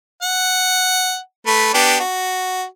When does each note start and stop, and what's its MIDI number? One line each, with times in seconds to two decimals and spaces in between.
0.23 1.18 78
1.47 1.71 57
1.47 1.71 71
1.74 1.97 59
1.74 1.97 62
1.74 1.97 67
2.00 2.64 66